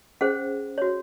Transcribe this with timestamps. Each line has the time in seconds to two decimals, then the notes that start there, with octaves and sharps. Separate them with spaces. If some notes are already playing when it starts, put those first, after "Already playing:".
0.21 C#4 G#4 C5 F#5
0.78 F#4 C#5